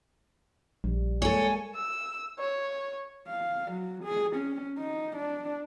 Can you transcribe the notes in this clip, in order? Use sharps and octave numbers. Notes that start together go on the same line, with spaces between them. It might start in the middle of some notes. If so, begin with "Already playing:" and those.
A#1 G3
G#3 A#3 A4 C#5 G#5
E6
C#5
F5
F#3
G#4
C#4
D#4
D4